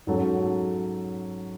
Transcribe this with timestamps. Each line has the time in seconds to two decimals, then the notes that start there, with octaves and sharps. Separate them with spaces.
0.07 G#2 F#3 C#4 F#4 A4